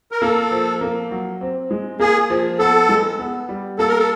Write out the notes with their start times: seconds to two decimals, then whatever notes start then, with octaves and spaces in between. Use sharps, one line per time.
0.12 A#4
0.21 A#3 A4
0.51 F3
0.81 A#3
1.11 F#3
1.41 C4
1.71 G#3
2.00 A#3 G#4
2.30 F3
2.59 B3 A4
2.89 G#3
3.19 B3
3.49 G3
3.79 A#3 A4
3.88 A#4
3.98 A4